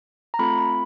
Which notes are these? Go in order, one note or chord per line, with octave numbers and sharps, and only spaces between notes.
A#5
A3 C4 F4 A4 B5
B5